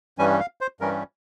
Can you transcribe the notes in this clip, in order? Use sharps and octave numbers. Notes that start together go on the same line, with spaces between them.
G2 E3 G3 C#4 G#5
F5
C5
G2 E3 G3 C#4 A#4